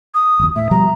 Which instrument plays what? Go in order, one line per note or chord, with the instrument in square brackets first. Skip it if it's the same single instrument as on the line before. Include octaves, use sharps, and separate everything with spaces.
[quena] D#6
[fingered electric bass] F#1 D#2
[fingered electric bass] A2 [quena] E5
[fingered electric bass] B2 F3 G3 [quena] A#5